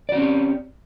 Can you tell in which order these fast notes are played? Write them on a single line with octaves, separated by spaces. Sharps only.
D5 F#4 C#4 C4 G4